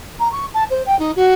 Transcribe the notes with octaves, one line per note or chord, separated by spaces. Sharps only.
A#5
C#6
A5
C5
G5
D#4
F#4